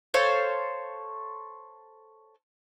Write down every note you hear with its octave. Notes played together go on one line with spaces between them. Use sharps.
A4 C5 C#5 F5